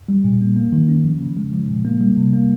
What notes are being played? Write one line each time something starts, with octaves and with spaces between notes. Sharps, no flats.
G3
A#2
A#3
A#3
D#3
C#4
F3
C#3
G#3
F3
A#2
A#3
G3
C3
A#3